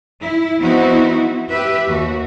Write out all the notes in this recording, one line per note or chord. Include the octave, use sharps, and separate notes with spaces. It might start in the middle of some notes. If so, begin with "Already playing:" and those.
E4
F3 B3 C4 D#4 E4 F#4
G4 B4 E5
D#2 F#4